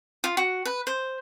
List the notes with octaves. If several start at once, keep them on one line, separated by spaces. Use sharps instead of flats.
F4
F#4
B4
C5